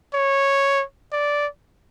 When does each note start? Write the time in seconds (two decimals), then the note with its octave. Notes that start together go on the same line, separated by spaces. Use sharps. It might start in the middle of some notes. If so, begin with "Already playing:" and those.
0.14 C#5
1.12 D5